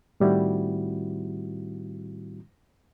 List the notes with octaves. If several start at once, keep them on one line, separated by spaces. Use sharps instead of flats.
A2 D#3 G3 C4 E4 F#4